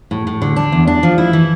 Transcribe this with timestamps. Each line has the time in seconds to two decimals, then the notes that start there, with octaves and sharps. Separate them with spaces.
0.11 A2
0.27 A2
0.42 D3
0.56 D4
0.72 E2
0.87 D4
1.03 F3
1.18 E4
1.33 E3